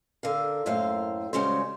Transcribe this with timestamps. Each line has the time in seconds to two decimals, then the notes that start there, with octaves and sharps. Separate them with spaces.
0.23 D3 A#4 F5
0.66 F#2 A2 A#3 C5 F5
1.33 C#3 G3 G#3 C#4 F#4 C5